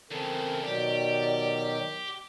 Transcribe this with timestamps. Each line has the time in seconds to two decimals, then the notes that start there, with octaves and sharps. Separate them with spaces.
0.11 E2 C#3 C4 A4 A#4
0.65 B2 D#3 F#3 G4 D5